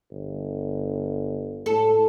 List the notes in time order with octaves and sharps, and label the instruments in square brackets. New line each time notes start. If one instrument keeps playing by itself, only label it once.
[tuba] G1
[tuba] A2 [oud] A4